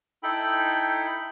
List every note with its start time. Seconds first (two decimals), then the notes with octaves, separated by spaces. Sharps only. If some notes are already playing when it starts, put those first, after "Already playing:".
0.23 D#4 E4 A4 G5 B5